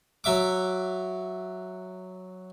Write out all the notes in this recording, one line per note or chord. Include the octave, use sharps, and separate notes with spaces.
F#3 E5 D6